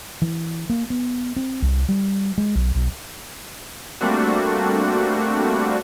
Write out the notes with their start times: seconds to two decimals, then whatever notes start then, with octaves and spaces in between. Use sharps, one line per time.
0.22 E3
0.70 A#3
0.90 B3
1.36 C4
1.62 C2
1.89 G3
2.38 G#3
2.55 B1
2.75 B1
4.01 G3 A3 A#3 C4 D4 F#4